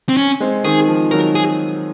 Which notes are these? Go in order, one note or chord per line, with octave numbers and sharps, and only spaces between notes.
C4
C#4
G#3 C4
D#3 G#4
F3
D#3 F#3 A#4
G#4